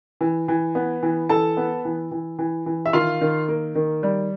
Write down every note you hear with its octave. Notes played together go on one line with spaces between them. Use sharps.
E3
E3
B3
E3
E3 A4 A5
B3
E3
E3
E3
E3
E5
D#3 F4 F5
D#3
A#3
D#3
G3